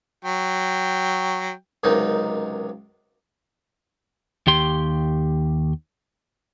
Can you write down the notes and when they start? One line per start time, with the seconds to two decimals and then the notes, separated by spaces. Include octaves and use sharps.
0.25 F#3 G5
1.84 C#2 F#2 C3 D#3 D#4
4.47 D#2 G4 C6